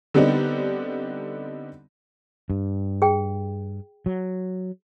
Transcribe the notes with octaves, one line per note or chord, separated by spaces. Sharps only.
D3 G3 B3 C4 D4 D#4
G2
G#4 G5
F#3